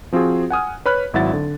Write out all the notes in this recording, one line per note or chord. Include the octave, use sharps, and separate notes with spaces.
F3 C4 F4 F#4 G#4
F#5 G#5 D#6 F6
B4 C#5 B5 F6 F#6
G#1 F#3 E4 E5 F#5 A6
D3